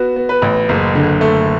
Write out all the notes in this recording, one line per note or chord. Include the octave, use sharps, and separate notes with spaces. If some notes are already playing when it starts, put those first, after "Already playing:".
Already playing: B3 F#4
B3
B4
A1
F#1
D3
A3